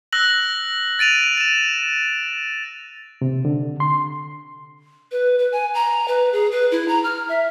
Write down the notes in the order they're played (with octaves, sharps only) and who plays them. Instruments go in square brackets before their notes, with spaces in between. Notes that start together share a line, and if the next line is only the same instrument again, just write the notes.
[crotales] E6 F#6 A#6 F#7
A6 D7 D#7 F7
D#7 E7
[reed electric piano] C3
D3
C6
[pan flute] B4
B4
G#5
A#5
B4
G#4
B4
E4
A#5
F6
E5